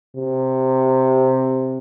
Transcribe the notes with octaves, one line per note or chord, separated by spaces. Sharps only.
C3